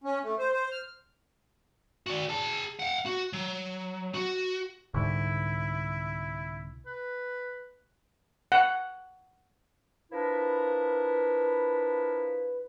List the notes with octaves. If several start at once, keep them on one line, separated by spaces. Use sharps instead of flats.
C#4
A3
C5
C5
F6
F#4 D5
G#4 A5
F5 F#5
F#4
F#3
F#4
C2 G#2 D3 E4
B4
F#5
F3 D4 E4 A#4 B4